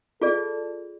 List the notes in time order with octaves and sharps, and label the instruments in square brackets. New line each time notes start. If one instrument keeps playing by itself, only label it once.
[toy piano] F4 G#4 D5 [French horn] A4